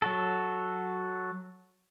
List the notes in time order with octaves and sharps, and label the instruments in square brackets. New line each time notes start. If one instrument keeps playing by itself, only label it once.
[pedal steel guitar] F#3 F#4 A4